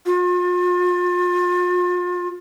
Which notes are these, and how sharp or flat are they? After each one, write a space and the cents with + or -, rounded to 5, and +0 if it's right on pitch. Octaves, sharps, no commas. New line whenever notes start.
F4 +40